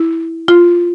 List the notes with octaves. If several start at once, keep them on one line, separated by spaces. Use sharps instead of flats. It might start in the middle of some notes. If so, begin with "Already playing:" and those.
Already playing: E4
F4